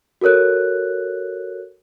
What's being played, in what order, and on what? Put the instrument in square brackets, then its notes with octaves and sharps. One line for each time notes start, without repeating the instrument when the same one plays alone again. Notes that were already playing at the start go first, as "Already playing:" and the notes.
[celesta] F#4 A4 A#4 C#5 F#6